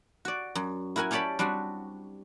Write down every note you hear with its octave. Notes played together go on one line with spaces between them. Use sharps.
F#4 D5
F#2
E4 F#4 A#4 F#5 G#5
C#4 G4 C#5 D5 A5 B5
G3 C4 D4 F#4